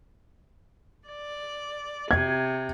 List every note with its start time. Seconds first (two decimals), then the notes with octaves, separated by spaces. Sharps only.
1.08 D5
2.11 C3 G#6